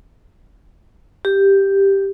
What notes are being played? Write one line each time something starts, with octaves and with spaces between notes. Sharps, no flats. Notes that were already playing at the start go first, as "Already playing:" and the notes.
G4